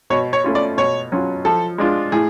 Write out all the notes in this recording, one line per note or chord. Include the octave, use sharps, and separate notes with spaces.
B2 C#5
C#5
A3 C#4 F4
D5
B2 C#5
F#3 C#4 F4
F3 A4
G#3 D4 F4
A2 G#4